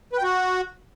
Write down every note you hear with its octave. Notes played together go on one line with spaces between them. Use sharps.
B4
G5
F#4